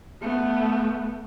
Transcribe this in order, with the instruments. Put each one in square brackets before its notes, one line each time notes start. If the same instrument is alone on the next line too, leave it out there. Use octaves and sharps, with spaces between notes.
[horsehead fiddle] A3 B3